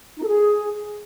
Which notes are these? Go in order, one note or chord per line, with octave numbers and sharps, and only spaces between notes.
D#4
A4
G#4